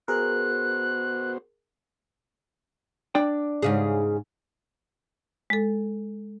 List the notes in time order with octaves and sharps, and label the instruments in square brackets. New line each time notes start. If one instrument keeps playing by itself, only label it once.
[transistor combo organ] B3 F#4 C5 [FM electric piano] G#4 A#4 [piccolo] F#6
[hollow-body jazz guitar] D4 D5 G5
[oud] G#2 C#3 G#4
[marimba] G#3 A4